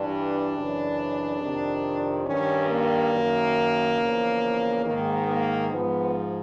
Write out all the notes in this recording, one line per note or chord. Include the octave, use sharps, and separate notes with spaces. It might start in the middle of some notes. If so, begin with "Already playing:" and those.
Already playing: G2 E3 D4
F#2 C#3 E3
F2 C3 D#3
G2 D#3 C#4
A#3
F#2 D#3
E2 C#3 F3
G#2 D#3 A#3
A#3
G#2 F3 B3